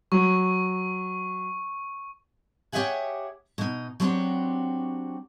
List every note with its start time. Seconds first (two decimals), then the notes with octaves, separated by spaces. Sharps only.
0.12 F#3 C#6
2.72 G4 C#5 D#5 E5 F#5 G#5
3.58 B2 D#4
4.00 F#3 C4 D4 F#4 G4